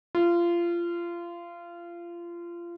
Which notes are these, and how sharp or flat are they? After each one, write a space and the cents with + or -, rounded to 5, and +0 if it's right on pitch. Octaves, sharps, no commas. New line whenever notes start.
F4 -25